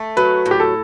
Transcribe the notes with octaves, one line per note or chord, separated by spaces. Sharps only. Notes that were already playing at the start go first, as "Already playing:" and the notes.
Already playing: A3
F#3 B4
A2
G4
A4